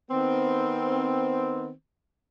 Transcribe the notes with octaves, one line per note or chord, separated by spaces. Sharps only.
D#3 B3 C4